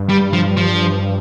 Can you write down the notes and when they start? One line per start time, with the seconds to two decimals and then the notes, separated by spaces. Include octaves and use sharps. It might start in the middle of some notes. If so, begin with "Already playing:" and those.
Already playing: G2
0.09 G3
0.33 F3
0.57 F3